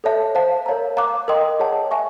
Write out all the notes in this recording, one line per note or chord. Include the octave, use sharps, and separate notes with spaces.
A4 C#5 E5 A5
C5 F5 A5
A#4 C#5 F5 A#5
F5 A#5 D6 F#6
A#4 D#5 G5 C6 D#6
G#4 C#5 F#5 A5
E5 G#5 C#6